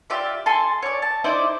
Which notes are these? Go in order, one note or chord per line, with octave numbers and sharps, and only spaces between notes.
F4 G4 D5 E5
A4 G#5 C6
C#5 D5
A5
D#4 E4 C5 D5